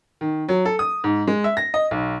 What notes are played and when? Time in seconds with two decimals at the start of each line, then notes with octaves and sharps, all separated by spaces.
0.21 D#3
0.48 F#3
0.65 A4
0.79 D#6
1.04 G#2
1.27 G#3
1.44 E5
1.57 A#6
1.74 D#5
1.91 B1